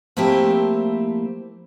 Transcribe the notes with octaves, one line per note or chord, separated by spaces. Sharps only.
F3 A3 A#3 C4 E4 G4